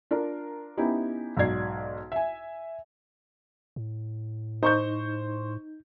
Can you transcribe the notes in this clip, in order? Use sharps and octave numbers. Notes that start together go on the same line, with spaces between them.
D4 F4 A#4
B3 C#4 D#4 E4 G4
B1 G#2 F#4 D5 G#6 C7
E5 G#5
A2
D#4 C5 C#6 G6